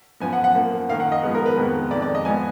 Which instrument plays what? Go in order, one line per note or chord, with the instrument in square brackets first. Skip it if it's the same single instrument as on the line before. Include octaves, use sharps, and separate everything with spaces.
[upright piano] F#2 F3 B3 G#5
F#5
F#5
F#2 F3 A#3
F#2 D#3 A#3 F5
F#5
D#5
G#2 F3 G#3 B3
A#4
B4
F2 D#3 G#3 B3
F2 D#3 G#3 D5
D5
D#5
G#2 F3 B3 G#5